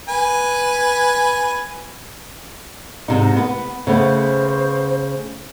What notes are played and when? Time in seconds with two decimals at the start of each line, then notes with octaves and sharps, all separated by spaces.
0.09 B4 G#5
3.08 G#2 C3 D#4
3.37 B3
3.87 C#3 A3 B3 C5